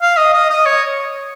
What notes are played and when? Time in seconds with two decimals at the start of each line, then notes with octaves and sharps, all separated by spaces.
0.02 F5
0.17 D#5
0.34 D#5
0.50 D#5
0.66 C#5